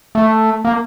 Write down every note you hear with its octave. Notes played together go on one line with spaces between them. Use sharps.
A3
A#3